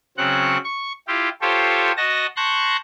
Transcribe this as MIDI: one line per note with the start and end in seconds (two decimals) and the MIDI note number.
0.18 0.57 49
0.18 0.57 54
0.18 0.57 60
0.18 0.57 78
0.18 0.57 90
0.64 0.92 85
1.08 1.29 64
1.08 1.29 65
1.08 1.29 67
1.42 1.92 65
1.42 1.92 67
1.42 1.92 69
1.42 1.92 72
1.42 1.92 73
1.97 2.26 66
1.97 2.26 75
1.97 2.26 81
1.97 2.26 94
2.36 2.77 81
2.36 2.77 84
2.36 2.77 85
2.36 2.77 90
2.36 2.77 91
2.36 2.77 94